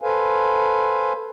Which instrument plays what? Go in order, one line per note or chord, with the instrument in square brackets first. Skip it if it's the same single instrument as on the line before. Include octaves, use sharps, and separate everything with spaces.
[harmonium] A4 B4 C5 F5 G#5